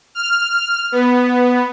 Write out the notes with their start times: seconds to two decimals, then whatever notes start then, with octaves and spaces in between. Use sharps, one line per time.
0.15 F6
0.92 B3